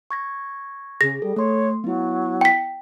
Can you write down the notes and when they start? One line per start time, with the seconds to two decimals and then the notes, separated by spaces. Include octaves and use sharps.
0.11 C#6 G#6 A#6
1.01 C#3 G#4 A#6
1.22 G3 A4
1.36 A3 C#5 C6
1.84 F#3 B3 E4
2.41 G5 B6